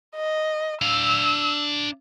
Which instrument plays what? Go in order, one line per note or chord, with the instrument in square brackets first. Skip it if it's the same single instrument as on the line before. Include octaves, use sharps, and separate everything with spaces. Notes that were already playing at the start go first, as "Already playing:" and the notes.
[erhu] D#5
[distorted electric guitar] D4 F5 [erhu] E6